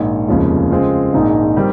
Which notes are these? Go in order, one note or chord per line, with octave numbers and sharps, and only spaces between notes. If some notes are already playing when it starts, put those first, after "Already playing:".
Already playing: A#1 G#2 D#3
F1 D#2 C#3 F3 G#3
C#3 G#3 C4 F4
A#1 G#2 D#3 G#3 D#4
D#3 G3 C4